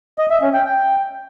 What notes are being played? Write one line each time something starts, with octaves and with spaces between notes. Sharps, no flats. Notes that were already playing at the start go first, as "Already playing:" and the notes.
D#5
E5
C#4
G5
G5